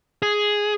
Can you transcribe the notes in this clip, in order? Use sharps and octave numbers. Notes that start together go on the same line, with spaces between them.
G#4